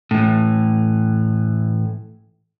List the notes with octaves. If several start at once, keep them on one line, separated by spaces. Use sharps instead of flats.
A2 E3